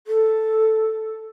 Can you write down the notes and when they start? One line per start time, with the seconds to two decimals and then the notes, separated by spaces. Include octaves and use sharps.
0.07 A4